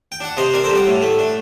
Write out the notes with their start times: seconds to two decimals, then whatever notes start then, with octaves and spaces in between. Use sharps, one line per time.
0.12 G5
0.20 D4 F#5
0.37 C3 C5 D#5
0.53 D4 A#4 D5
0.64 A4 C5
0.70 G3
0.75 D5 F#5
0.86 A2
1.02 A3
1.18 D4